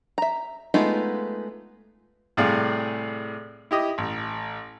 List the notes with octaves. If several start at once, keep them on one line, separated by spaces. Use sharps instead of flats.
E5 A#5
G#3 A3 B3 D#4 F4
A2 C3 G3 G#4 D5 F5
E4 G4 D#5
A1